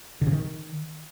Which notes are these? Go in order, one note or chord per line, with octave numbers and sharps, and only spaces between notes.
D3
C3
D#3